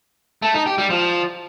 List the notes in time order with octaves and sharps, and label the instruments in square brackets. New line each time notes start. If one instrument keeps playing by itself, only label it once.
[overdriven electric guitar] A3
D#4
G4
G3
F3